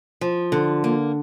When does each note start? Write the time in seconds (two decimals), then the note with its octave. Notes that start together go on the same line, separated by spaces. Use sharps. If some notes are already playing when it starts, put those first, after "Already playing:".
0.21 F3
0.52 D3
0.84 A#3